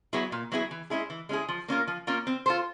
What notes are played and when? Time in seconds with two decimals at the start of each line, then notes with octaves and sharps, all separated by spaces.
0.13 F#3 B3 E4 G#4
0.32 A#2
0.52 F#3 B3 E4 G#4
0.71 E3
0.90 G#3 C#4 E4 G#4
1.10 E3
1.29 G#3 C#4 E4 G#4
1.49 F3
1.68 A#3 C#4 F4 A#4
1.88 F3
2.07 A#3 C#4 F4 A#4
2.27 C4
2.46 F4 A4 C5